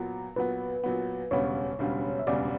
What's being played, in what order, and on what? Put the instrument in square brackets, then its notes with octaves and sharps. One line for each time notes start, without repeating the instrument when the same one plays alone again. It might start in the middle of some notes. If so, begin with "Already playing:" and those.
Already playing: [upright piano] A#2 F#3 B3 [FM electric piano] A#5
[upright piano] A#2 F#3 B3 [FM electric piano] B4
[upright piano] A#2 F#3 B3
[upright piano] E1 D2 C#3 G3 B3 [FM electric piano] C#5
[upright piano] E1 D2 C#3 G3 B3
[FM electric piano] E5
[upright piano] E1 D2 C#3 G3 B3 [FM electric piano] D5